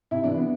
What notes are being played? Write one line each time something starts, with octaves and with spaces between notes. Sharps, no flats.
C3 E4
E3 D4
B3